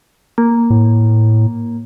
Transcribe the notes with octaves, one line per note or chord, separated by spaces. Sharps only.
A#3
A2